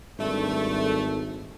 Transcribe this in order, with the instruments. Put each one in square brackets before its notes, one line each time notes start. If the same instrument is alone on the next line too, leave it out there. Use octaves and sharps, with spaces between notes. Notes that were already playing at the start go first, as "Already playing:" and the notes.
[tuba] G#1 [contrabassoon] G2 [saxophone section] A3